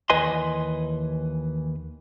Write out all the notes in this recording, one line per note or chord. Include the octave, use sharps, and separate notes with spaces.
D#2 E3 B4 D#5 G#5 C6